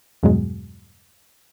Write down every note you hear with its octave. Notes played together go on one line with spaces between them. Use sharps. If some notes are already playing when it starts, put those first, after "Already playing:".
E2 G2 B2 F#3 G#3